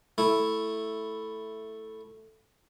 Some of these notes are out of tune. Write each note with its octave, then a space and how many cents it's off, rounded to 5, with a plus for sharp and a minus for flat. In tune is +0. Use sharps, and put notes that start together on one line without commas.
A3 +0 E4 +0